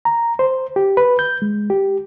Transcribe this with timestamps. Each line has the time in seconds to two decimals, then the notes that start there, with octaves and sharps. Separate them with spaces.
0.05 A#5
0.39 C5
0.76 G4
0.97 B4
1.19 G6
1.42 G#3
1.70 G4